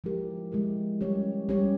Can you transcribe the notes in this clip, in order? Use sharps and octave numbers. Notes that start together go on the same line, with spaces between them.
F3 G#3 E4 G4 A#4
F3 G#3 E4 G4 A#4
G3 C#4 G4 C#5
G3 C#4 G4 C#5